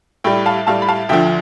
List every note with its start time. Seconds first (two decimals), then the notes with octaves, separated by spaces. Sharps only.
0.24 A2 G3 G5 B5
0.46 F5 A5
0.67 A2 G3 F5 A5
0.82 B5
0.89 F5 A5
1.09 D2 D3 F3 E5 G5